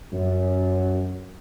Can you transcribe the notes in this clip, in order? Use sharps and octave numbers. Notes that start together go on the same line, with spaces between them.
F#2